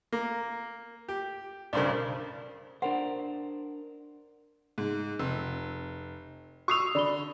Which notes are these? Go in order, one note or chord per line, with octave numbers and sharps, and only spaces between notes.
A#3
G4
B1 G2 C#3 A#4 C5 D5
D4 A#4 C5 F#5
G#2
F1 E6
F#4 C#6 D#6 E6 C7 F7
D3 D5 B5 G7